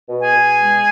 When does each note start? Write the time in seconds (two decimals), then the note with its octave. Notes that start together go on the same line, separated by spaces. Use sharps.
0.09 B2
0.20 G#4 G#5
0.34 B2
0.58 G#3